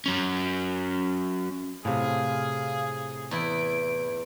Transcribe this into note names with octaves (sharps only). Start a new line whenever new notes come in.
F#3 C#4
A2 C3 G#4 F5
E2 E4 D7